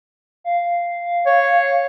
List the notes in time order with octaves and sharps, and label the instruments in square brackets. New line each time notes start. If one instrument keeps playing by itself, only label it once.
[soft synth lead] F5
[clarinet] C#5